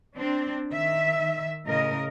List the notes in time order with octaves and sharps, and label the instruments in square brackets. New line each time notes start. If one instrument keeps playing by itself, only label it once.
[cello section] C4 D4
D#3 E5
A2 C#3 A#4 D#5